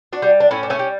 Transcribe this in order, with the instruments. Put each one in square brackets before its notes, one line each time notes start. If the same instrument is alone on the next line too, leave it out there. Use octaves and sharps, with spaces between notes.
[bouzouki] D4 F#4
G3
D4
A2 C#4 E4
D4
A3 C#4
G3